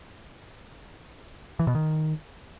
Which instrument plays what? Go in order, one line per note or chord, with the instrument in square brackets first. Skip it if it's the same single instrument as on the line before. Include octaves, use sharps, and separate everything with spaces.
[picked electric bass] E3
B2
D#3